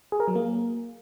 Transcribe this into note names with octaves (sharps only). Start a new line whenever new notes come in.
G#4
A#4
F#3
A#3